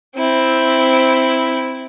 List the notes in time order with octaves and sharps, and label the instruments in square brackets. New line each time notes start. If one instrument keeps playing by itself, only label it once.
[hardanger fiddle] C4 E4